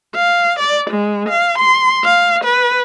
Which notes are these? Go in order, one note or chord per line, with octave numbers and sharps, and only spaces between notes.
F5
D5
G#3
F5
C6
F5
B4